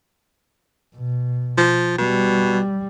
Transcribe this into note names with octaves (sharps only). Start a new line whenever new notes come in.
B2
F3
B2 G3